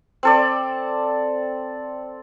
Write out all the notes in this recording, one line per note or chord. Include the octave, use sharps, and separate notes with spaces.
C4 A4 D5